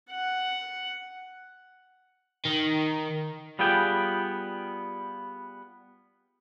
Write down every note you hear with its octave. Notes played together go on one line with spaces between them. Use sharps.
F#5
D#3
G3 B3 F4 G#4 G5